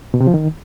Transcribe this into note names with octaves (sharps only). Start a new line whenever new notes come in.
B2
C3
F3
D#3